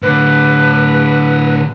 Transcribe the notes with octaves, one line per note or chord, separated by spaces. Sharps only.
A2 D3 B4